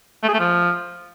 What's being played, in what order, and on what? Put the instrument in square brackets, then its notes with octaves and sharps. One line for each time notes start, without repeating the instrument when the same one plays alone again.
[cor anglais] A3
G#4
A3
F3